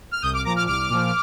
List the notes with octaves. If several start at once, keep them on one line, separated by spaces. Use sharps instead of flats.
F6
C2 D#6 G6
D6 F6
A#2 F3 A#5 D6
D6 F6
C2 D6 F6
A#2 F3